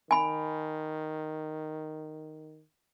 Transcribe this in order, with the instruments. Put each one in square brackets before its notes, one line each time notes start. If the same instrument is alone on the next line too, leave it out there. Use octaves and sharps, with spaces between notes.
[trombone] D#3 [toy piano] G#5 B5